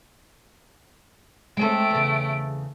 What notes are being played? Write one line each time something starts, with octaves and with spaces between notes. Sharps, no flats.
G#3 A3 C4 A4 D7
E2 C#3